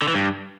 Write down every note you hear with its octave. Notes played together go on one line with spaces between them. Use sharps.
D3
E3
G2